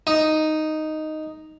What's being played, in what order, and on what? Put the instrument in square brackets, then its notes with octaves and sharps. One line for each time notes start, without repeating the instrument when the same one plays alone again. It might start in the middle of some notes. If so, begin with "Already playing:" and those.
[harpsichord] D#4